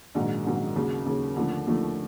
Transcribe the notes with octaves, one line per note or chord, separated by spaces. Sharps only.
A#1 G#2 D#3 F#3
A#1 G#2 D#3 F#3
D#2 C#3 F#3
D#2 C#3 F#3
D#2 D3 F3 A3
D#2 D3 F3 A3